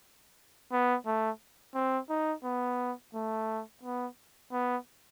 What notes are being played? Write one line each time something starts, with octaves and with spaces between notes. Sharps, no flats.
B3
A3
C4
D#4
B3
A3
B3
B3